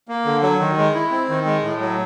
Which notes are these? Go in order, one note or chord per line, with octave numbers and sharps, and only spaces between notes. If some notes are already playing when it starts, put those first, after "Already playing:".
A#3
D3
F#3
D#3
G#3
E4
C4
D#3
G#3
A2
F#3